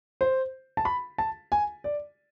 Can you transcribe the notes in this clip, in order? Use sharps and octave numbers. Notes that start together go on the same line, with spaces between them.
C5
A5
B5
A5
G#5
D5